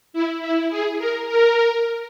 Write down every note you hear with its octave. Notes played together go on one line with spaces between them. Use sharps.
E4
E4
G#4
A#4
A#4